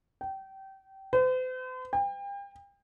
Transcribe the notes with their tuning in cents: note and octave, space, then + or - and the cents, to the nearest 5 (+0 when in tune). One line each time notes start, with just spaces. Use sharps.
G5 -25
C5 -45
G5 +35